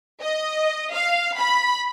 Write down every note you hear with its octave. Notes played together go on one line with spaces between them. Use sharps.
D#5
F5
B5